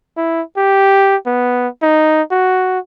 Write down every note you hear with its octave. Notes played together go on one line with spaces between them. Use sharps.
E4
G4
B3
D#4
F#4